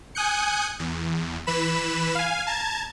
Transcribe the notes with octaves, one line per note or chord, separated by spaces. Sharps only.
G#5 D#6 F#6 G6 C#7
E2
E3 B4 B5 E7
F5 G#5
A5 A#5 G#6